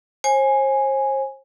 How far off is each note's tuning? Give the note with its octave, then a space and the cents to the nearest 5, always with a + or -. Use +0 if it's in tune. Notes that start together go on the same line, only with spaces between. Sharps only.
C5 +40 G#5 +0